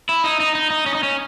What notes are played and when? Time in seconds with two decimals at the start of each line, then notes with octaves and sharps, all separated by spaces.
0.09 E4
0.24 D#4
0.40 D#4
0.55 D#4
0.70 D#4
0.86 C#4
0.95 D#4
1.03 C#4